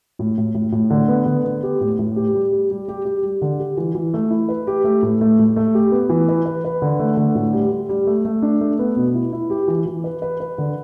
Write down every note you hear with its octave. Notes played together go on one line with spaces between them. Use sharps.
A2
A2
A2
A2
D3
B3
D3
B3
G4
A2
A2
G4
G3
G4
G3
G4
G4
G3
D3
G4
E3
E3
A3
E4
B4
G4
A3
A2
A3
A2
A3
G4
B3
E3
B4
B4
B4
D3
A3
D3
A2
G3
G3
G3
A3
A3
D4
A3
B3
B2
E4
E4
G4
E3
E3
B4
B4
B4
D3